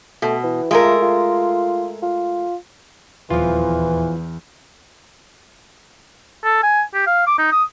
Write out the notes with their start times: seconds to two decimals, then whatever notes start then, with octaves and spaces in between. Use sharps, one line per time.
0.22 B2 A3
0.43 E3
0.71 G#3 A3 F4 A#4
1.02 F4
2.02 F4
3.30 D#1 E2 E3 F3 F4
6.44 A4
6.63 G#5
6.94 G4
7.07 F5
7.27 D6
7.38 D#4
7.52 D#6